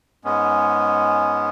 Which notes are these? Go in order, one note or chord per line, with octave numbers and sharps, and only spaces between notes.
G#2 G#3 B3 C#4